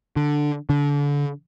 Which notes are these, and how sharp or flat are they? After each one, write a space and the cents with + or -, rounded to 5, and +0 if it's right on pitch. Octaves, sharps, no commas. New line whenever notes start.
D3 +5
D3 -30